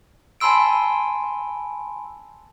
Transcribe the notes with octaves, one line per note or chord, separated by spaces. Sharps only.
G#5 A5 B5 C6 E6 D7